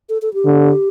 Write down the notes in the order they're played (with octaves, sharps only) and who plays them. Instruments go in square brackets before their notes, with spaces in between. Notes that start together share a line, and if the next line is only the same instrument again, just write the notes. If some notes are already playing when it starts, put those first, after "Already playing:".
[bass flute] A4
A4
G4
[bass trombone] D3